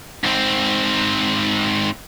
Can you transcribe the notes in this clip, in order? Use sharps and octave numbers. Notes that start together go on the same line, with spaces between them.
G#2 C4